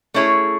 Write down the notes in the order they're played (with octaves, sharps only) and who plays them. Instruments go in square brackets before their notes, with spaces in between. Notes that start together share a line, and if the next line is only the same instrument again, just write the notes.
[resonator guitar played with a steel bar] A3 C#4 E4 G#4 C#5